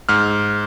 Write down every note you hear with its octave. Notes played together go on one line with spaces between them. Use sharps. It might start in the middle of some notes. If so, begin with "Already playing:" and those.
G#2 F6